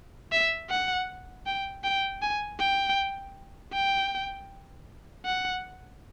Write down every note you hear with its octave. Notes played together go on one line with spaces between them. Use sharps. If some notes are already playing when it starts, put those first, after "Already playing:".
E5
F#5
G5
G5
G#5
G5
G5
F#5